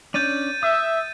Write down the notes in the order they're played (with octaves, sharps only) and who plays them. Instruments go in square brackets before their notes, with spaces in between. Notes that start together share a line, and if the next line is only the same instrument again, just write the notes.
[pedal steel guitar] C#4 D4 [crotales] G6 A6 D#7
[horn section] E5 [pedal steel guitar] D#6